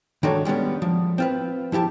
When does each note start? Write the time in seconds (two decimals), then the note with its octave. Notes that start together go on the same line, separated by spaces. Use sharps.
0.23 D#3 G#3 D4 F#4 A4 C#5
0.45 G3 G#3 B3 C#4
0.82 F3
1.18 C4 F4 B4
1.72 F3 E4 G4 A5